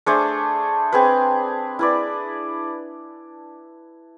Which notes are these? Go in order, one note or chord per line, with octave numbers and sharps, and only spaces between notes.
A3 D4 G#4 C5
C4 G#4 B4
E4 B4 D5